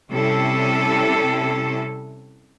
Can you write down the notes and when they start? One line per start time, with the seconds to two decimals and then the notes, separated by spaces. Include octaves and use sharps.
0.11 C3 G3 C#4 E4 A4